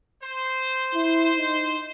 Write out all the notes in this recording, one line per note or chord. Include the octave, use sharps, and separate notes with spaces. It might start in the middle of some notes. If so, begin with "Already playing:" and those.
C5
E4
D#4